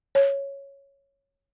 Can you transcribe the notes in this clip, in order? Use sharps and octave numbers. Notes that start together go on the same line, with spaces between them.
C#5